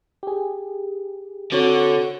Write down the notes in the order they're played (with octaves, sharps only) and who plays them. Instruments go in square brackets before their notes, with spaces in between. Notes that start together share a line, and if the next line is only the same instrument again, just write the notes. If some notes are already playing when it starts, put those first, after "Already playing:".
[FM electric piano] G4 G#4
[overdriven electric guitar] D3 [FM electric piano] C4 C#5 [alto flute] F#4